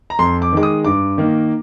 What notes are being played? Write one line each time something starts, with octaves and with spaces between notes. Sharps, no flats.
A#5
F2 C6
D6
D#3 G#3 D6
D#6
G2 D6
D#3 A#3